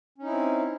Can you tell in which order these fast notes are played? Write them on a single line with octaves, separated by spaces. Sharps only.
C#4 D#4 E4 C4